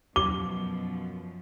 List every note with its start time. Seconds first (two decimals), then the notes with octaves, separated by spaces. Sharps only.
0.16 F#2 B2 F3 D6 G7